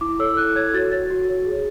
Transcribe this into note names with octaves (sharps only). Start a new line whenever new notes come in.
E4 D6
A4 C#5 E6
E4 F#6
A4 C#5 G#6
F#4 A6
C#5 A6
F#4
C#5
G#4